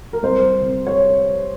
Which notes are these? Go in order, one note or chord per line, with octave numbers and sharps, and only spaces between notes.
A#4
C2 C5
C3
C#5